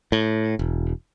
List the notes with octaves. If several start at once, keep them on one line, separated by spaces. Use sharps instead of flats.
A2
E1